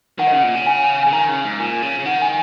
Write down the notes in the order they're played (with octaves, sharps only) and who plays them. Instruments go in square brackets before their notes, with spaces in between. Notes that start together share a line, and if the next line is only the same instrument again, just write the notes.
[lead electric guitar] D#3 [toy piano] F#5
[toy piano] D#5
[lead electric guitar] C#3 [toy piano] F#5
[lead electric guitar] A#2
C#3
[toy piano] G#5
[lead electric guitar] C#3 [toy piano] G#5
[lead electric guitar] D#3 [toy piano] A#5
[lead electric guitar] C#3
G#2
[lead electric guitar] A#2 [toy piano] G#5
[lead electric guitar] C#3
C#3
[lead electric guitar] D#3 [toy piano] F#5
[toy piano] G#5